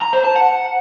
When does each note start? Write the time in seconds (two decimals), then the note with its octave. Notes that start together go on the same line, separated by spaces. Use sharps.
0.01 A#5
0.13 C5
0.24 A5
0.36 F#5